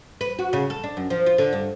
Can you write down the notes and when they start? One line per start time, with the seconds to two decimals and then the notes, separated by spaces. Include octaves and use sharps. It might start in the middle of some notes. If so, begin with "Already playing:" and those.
0.21 B4
0.39 F#4
0.53 C#3
0.70 A4
0.84 D4
0.97 F#2
1.10 F3
1.26 F4
1.38 D3
1.53 G2